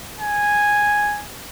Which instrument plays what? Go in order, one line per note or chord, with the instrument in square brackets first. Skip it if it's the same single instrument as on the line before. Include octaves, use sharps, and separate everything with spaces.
[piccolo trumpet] G#5